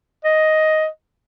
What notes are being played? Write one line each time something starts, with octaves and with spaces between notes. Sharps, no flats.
D#5